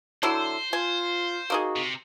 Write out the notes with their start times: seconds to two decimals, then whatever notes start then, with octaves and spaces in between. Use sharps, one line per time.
0.23 D3 F#3 E4 C5
0.73 F4 G#5
1.50 A#3 D#4 F#4 G#4
1.76 C3